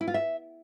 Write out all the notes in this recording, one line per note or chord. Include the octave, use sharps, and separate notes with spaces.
E4
F4
E5